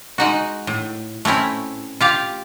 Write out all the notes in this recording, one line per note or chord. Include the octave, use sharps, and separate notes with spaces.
G#3 D#4 F#4
A2
A3 C4 C#4 E4
F4 G4 F5